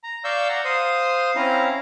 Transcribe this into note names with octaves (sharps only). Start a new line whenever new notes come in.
A#5
D5 F5 C#6 E6 G6
F#5 A#5
C5 F5 C6 D#6
C4 C#4 E4 F5 A#5